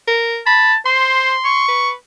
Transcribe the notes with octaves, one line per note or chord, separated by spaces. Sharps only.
A#4
A5 B5
C5 C6
C#6
B4